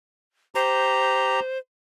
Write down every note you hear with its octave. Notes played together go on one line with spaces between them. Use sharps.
G4 C5 A#5